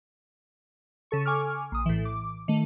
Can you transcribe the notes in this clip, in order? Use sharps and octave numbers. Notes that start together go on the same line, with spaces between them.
C#3 A4 C#6
G#5 C#6 D6 F6
A#1 D#6
A2 E3
D6
D#3 A3